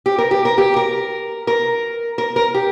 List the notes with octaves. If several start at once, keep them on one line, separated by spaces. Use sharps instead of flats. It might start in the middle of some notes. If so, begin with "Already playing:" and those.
G4
A#4
G4
A#4
G4
A#4
A#4
A#4
A#4
G4